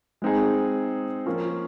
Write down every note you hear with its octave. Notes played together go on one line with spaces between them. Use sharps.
G#3 C4 D#4 G#4
F3 A#3 C#4